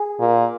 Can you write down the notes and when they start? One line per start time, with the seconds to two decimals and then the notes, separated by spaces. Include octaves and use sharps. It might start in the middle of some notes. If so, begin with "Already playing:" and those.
Already playing: G#4
0.19 A#2